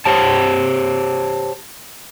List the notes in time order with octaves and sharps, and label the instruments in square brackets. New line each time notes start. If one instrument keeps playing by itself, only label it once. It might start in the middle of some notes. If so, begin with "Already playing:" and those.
[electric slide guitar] G4 C5 C#5 A5